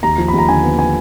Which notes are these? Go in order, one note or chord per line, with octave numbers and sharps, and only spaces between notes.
D#2 A#5
F3
D#2 B5
A#5
D3 G#5
B3
B3 G#5